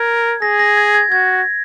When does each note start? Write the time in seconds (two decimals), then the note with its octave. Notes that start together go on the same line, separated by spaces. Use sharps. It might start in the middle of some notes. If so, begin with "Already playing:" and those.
Already playing: A#4 G#6
0.42 G#4 A#6
0.59 A#6
0.77 G#6
0.95 G#6
1.11 F#4 G#6